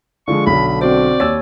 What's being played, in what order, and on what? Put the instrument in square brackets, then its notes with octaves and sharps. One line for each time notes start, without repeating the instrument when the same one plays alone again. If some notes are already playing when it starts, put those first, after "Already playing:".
[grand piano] D3 F3 G#3 [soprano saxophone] C#6
[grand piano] B1 D3 [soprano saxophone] B5
[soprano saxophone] B5
[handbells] C4 F#4 C5 [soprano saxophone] D5
[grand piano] D#2 E6 A6 [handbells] C#5